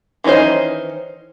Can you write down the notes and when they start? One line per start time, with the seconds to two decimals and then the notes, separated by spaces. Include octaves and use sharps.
0.24 D#3 E3 C#4 D#4 C5